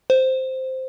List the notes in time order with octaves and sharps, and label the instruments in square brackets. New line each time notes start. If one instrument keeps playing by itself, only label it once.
[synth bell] C5